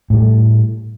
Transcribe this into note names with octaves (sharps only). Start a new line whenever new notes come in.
A2 G3 A3